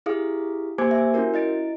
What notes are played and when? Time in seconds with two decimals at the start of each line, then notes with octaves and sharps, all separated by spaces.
0.06 E4 G4 G#4 F5 D#6
0.78 A#3 G4 C5 G#5 D6 G#6
0.91 E5 G#5
1.14 C#4 E4 F#4 A#4
1.34 E4 D#5 A6 D7